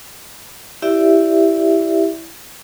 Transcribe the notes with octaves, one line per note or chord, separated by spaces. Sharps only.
E4 G4 D5 E5